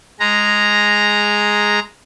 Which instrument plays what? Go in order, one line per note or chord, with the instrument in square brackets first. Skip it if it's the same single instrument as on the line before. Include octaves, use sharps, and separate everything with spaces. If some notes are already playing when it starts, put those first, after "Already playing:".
[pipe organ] G#3 A#5